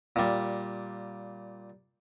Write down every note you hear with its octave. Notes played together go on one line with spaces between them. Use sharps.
A#2 G3